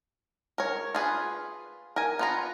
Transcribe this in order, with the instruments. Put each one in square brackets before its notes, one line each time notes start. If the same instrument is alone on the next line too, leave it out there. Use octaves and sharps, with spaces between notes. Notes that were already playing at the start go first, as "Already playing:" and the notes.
[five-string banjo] A#4 C#5
F4 G#4 B4
A#4 G#5
B3 F4 A#5